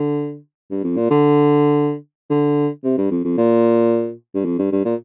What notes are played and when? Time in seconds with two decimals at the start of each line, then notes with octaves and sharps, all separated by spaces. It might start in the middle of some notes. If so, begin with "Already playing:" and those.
Already playing: D3
0.71 G2
0.84 F2
0.96 A#2
1.11 D3
2.31 D3
2.84 C3
2.98 G2
3.11 F2
3.24 F2
3.37 A#2
4.35 G2
4.45 F2
4.59 G2
4.72 G2
4.85 A#2